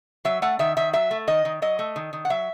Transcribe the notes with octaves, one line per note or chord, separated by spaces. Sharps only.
F#3 E5
A3 F#5
D#3 E5
D#3 E5
F#3 E5
A3
D#3 D#5
D#3
F#3 D#5
A3
D#3
D#3
F#5
F#3 E5